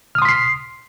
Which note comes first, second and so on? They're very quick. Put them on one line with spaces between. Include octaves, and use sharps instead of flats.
F6 D#6 C6 B6 C7